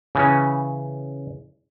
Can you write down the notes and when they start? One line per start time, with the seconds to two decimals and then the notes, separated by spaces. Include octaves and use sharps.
0.15 C#3 E3 C#4